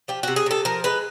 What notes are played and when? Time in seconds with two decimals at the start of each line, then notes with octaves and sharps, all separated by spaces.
0.08 F3 G4
0.23 C3 F#4
0.36 G#4
0.46 C3 A4
0.65 F3 A#4
0.84 G#3 B4